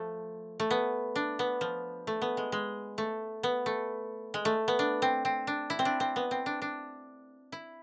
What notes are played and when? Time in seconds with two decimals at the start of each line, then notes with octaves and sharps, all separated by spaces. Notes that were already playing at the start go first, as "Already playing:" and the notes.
Already playing: F3 A3
0.60 A3
0.71 B3
1.16 D4
1.39 B3
1.61 F3
2.07 A3
2.22 B3
2.37 G#3
2.52 G#3
2.98 A3
3.43 B3
3.66 A3
4.34 G#3
4.45 A3
4.68 B3
4.79 D4
5.02 C4
5.25 C4
5.47 D4
5.70 E4
5.79 C4
5.85 D4
6.00 C4
6.16 B3
6.31 C4
6.46 D4
6.62 D4
7.52 E4